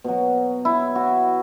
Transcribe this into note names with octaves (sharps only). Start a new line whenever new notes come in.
B2 F#3
E4
F#4